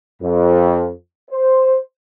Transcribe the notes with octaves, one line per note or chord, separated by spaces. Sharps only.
F2
C5